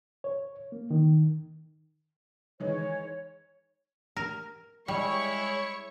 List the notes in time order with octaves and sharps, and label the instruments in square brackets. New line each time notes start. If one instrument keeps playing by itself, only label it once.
[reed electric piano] C#5
A#3
D#3
[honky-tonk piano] D#3 E3 G#3 [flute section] C#5
[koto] A#4
[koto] G3 [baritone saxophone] G#3 [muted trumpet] E4 [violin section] C#5 C#6